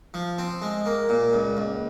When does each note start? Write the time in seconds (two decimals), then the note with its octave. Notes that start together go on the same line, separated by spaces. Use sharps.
0.14 F3
0.38 C4
0.62 G#3
0.86 A#3
1.09 A#2
1.33 C#2
1.57 C#2